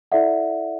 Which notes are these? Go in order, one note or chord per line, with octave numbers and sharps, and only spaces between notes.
E4 A4 D5 E5 F#5